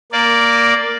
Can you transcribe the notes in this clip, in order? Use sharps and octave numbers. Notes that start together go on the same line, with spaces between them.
A#3 D5